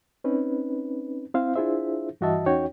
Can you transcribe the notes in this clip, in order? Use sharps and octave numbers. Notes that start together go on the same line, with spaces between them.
C4 C#4 D#4 B4
C4 E4 C5 F5
D4 E4 F4 G#4 C5 E5
G2 E3 F#4 D#5 E5 A5
E2 C#4 D#4 F#4 C#5 G5